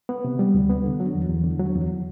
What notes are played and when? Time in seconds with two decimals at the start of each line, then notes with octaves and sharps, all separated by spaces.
0.09 B3
0.25 C3
0.39 G3
0.54 D2
0.69 B3
0.84 D3
1.00 F#3
1.15 E2
1.29 E2
1.44 D3
1.59 F#3
1.75 E2